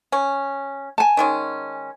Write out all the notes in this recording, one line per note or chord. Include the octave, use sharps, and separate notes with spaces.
C#4
G#5 A5
D#3 G#3 C#4